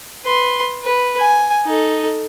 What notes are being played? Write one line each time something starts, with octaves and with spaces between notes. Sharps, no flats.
B4 C6
B4
G#5
D#4 A4